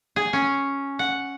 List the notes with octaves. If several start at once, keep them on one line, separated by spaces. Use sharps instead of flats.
G#4
C#4
F#5